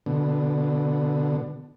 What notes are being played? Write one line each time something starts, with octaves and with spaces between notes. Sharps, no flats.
B2 D3